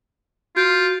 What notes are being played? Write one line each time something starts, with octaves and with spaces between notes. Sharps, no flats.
F4 F#4 G6 D7